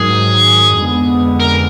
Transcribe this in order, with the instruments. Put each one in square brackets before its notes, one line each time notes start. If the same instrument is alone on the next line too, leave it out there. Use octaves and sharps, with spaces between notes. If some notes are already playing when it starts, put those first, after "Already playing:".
Already playing: [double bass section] G#2 D#3 F#3 [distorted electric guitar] G#4
[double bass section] F2 D3 G#3 B3
[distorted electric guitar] A#4